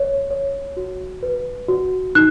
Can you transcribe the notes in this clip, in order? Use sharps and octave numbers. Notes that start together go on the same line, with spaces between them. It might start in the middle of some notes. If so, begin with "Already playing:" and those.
Already playing: C#5
C#5
F#4
B4
F#4
D#4 F#6